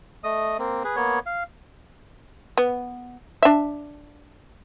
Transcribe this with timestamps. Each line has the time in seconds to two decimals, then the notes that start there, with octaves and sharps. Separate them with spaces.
0.24 A3 D#5 D#6
0.59 A#3 C4
0.84 G#4 B4
0.96 A#3 B3 C#5
1.26 F5
2.57 B3
3.43 D4 E5